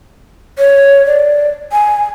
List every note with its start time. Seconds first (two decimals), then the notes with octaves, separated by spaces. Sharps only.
0.59 C#5
1.06 D5
1.72 G#5